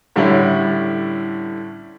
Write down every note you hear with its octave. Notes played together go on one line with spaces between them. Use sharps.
A2 D3 G3 C#4 E4